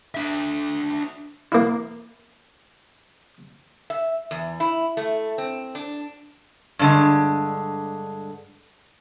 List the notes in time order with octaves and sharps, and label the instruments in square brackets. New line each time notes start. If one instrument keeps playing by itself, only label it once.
[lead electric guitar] D4 E5
[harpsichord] A#3 E4
[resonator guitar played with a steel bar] E5
E2
E4
A3
C4
D4
G2 D3 G#3